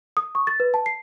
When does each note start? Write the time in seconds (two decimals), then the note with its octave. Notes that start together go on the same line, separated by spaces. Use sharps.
0.17 D#6
0.35 C#6
0.47 A6
0.60 B4
0.74 A5
0.86 C7